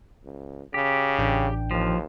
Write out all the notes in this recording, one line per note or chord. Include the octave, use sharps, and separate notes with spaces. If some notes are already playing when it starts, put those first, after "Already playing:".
C#2
C#3 G4
A1 D4 G5
D#2 F3